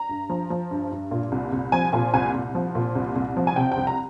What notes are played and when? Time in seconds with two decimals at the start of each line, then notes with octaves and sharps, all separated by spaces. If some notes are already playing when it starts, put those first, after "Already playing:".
Already playing: A#5
0.09 G2
0.30 F3
0.50 F3
0.71 G2
0.92 G2
1.11 A#2
1.32 C2
1.52 C2
1.72 F3 G#5
1.93 A#2 G#5
2.14 C2 G#5
2.34 C2
2.55 F3
2.75 A#2
2.95 C2
3.16 C2
3.37 F3
3.47 G#5
3.56 C3 G5
3.72 G5
3.77 C2
3.87 A#5